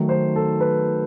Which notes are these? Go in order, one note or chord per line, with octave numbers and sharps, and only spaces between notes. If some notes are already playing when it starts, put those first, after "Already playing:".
Already playing: D#3 F#3 A3
C5
A4
B4